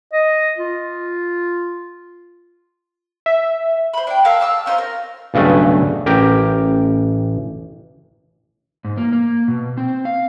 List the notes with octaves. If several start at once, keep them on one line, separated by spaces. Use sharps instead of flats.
D#5
F4
E5
C5 B5
D4 G5
A#4 E5 F5 A5
F5 A5 D6 E6
C#4 D#4 F4 C5
A#4
B1 G2 C#3 A3 B4
A1 G4 A#4 G5
G#2
A#3
A#3
B2
C4
F5